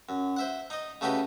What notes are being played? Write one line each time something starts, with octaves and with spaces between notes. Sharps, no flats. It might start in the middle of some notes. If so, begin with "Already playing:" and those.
F#2
C5 E5 F#5
D#4 D#5
C#3 A3 D#4 F#4 G4 B4